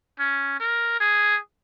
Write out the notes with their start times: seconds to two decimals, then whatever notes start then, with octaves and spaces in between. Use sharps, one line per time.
0.19 C#4
0.60 A#4
1.00 G#4